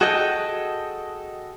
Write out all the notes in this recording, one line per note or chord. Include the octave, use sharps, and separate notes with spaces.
F#4 G#4 A4 D#5 G5